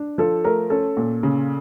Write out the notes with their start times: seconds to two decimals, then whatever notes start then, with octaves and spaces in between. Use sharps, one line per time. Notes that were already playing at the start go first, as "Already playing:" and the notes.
Already playing: D4
0.18 F3 A4
0.44 A3 A#4
0.70 C#4 A4
0.97 A#2
1.23 C#3